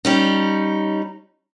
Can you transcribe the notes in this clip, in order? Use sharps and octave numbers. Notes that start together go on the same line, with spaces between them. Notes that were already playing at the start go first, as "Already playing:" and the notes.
G3 C#4 D#4